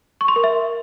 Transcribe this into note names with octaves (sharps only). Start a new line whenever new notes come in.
C#6
C6
A#4
E5